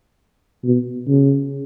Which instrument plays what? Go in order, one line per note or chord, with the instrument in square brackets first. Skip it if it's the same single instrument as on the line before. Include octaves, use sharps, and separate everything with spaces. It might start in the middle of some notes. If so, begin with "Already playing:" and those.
[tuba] B2
C#3